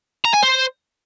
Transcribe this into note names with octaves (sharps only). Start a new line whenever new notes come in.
A#5
G#5
C5